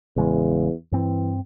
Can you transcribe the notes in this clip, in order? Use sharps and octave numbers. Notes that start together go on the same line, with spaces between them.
A1 E2 C#3 G#3
G2 E3 C4